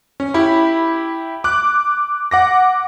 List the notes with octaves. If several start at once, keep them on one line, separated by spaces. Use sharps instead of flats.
C#4
E4 G4 B5
D6 F#6
F#5 D6 A#6